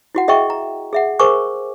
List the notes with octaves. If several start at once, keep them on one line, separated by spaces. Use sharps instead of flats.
E4 F#4 F#5
G#4 D#5 E5 G5 C#6
A#5
G#4 E5 F#5
G#4 A#4 C5 G#5 C#6 D6